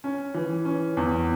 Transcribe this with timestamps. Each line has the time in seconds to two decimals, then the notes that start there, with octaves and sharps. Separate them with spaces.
0.04 C#4
0.34 E3
0.65 C#4
0.97 E2